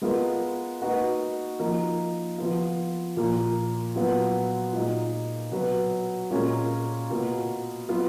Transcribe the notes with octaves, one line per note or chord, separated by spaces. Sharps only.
G#3 B3 F4 A#4
A#3 D#4 F#4 B4
F3 A#3 D#4
F3 B3 F4
A#2 F3 A#3
A#2 F#3 B3 F4
A#2 G#3 D#4
B2 F#3 B3 F#4 B4
A#2 G#3 C#4 F4 A#4
B2 A#3 F4
F#3 B3 F4 B4